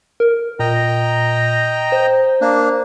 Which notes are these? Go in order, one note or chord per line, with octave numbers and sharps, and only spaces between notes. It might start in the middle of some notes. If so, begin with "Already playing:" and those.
A#4
A#2 D#5 G5 A#5
C5
A#3 D4